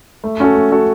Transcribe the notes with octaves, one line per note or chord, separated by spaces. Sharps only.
A3
C#4 F#4 A4
A3
C#4 F#4 A4